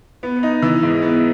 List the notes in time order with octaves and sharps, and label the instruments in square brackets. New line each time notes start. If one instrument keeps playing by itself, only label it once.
[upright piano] B3
D#4
E3
G#2
B3